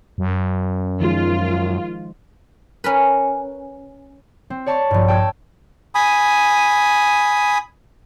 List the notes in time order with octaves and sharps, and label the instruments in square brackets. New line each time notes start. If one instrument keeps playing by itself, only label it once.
[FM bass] F#2
[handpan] D#3 F3 G#3 [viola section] F4
[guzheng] C#4 A#4 B4
[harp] C4
C#5 D5 A5 C#6
A#1 G2
G5 A5 E6 G#6
[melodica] G#5 B5 D#6